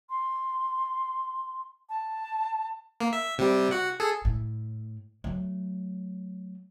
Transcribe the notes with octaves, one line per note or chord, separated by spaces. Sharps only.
C6
A5
A#3
E5
C3 G3
F#4 F#5
G#4 A4
A2
F#3 A3